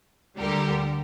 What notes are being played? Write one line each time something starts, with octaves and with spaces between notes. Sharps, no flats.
D2 D3 G3 G4 A#4